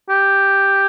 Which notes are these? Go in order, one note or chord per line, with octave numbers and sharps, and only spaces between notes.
G4